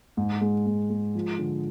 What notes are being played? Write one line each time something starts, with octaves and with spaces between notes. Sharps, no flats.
G#2
G#3
G#2
G#3
F3
D3